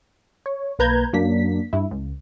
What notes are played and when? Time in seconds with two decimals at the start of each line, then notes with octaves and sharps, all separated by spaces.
0.46 C#5
0.79 B1 A#3 B4 A#5 G6 G#6
1.13 F#2 F#3 A#3 D4 B6
1.73 G2 E4
1.91 C#2